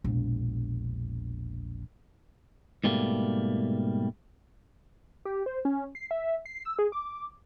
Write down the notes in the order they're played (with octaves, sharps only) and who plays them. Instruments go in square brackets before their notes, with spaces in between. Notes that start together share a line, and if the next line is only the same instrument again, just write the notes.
[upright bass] E1 A#1
[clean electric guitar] G#2 B2 G3 A3 A#3
[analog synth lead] G4
C5
C#4
C7
E5
C7
E6
G#4
D6